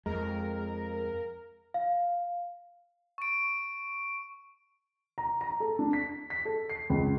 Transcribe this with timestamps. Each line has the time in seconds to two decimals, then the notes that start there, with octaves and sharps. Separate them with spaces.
0.06 F2 G#3 A#4
1.74 F5
3.18 C#6 D7
5.18 A#5
5.41 A#5
5.60 A4
5.79 D4
5.93 B6
6.30 B6
6.45 A4
6.70 C7
6.90 C#2